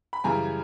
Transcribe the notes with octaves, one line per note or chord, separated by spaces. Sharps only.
B5
F#2 C#3 E3 G3 G#5 A#5